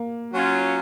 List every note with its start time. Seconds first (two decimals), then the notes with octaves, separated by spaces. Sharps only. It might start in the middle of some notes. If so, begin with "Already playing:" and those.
Already playing: A#3
0.33 F#3 C#4 F4